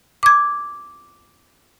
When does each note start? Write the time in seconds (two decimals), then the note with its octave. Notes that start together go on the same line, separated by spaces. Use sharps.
0.23 D6 G#6